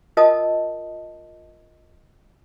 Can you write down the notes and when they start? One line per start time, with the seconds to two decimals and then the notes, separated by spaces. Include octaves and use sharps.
0.17 F4 A#4 D#5 A5 D#6